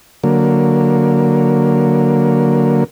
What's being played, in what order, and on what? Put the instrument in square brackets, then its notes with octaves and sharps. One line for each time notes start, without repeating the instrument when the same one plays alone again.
[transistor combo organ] D3 F#3 A#3